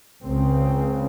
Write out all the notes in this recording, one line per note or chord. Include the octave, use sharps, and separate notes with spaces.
C#2 C#3 C4